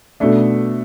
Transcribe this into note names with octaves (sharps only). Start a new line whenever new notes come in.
B2 A3 D4